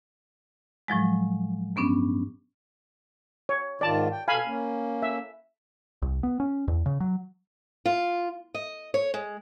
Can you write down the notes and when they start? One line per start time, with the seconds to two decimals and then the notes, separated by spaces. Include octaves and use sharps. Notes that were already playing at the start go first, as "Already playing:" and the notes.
0.88 A2 F3 F#3 G#3
1.76 G2 B3 C#4 D4
3.49 C#5
3.81 G#2 D#3 F4 D5 A5
4.12 G5
4.28 B2 A4 F5 G#5 B5
4.45 A#3 C#4
5.02 E5
6.02 C2
6.23 B3
6.40 C#4
6.68 E2
6.86 C#3
7.00 F#3
7.86 F4
8.54 D#5
8.94 C#5
9.14 G#3